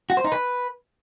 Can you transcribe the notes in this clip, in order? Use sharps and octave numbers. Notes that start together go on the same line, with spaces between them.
F#4
C5
D#4
B4